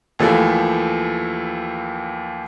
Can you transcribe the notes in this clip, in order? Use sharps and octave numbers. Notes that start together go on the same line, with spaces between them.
D#2 E3 F3 A3